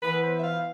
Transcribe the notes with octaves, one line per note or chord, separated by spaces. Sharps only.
E3 B3 E4 B4
C5
E5
F5